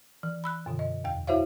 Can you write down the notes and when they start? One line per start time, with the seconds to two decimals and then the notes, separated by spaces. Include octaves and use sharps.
0.23 E3
0.44 B5 E6 F#6
0.66 F#2 B2 D3
0.79 D#5
1.04 E2 G5
1.27 E4 F#4 C5 C#5 E5 F5